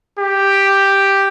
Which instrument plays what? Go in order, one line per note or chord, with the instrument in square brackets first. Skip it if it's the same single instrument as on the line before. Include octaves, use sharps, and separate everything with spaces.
[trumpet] G4